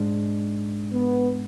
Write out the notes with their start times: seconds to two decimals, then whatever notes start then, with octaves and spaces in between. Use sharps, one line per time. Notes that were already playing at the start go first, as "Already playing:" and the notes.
Already playing: G#2 G#3 D4
0.92 B3